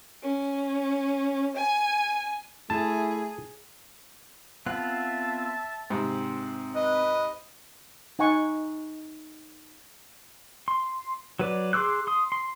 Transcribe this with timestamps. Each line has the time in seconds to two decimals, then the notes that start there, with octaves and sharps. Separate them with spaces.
0.23 C#4
1.56 G#5
2.70 A3 E4 G#4 A5
4.66 B3 C4 F4 E5 A5 F#6
5.90 G#2 C3 C4
6.76 B4 D#5
8.19 D#4 F#5 G#5 C#6
10.68 C6
11.39 F#3 B4 D5
11.73 G#4 C6 D6 E6 F#6
12.07 C6 D#6
12.32 C6